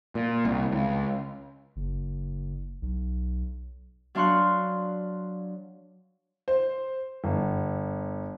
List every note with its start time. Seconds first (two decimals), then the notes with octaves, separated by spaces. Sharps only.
0.15 A#2
0.45 C2
0.72 C#2
1.76 F#1
2.82 B1
4.15 F#3 D4 F5 C6 C#6 F#6
6.48 C5
7.24 G1